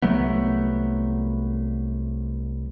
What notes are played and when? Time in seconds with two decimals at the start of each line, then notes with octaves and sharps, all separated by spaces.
0.02 C2 F#3 A3 B3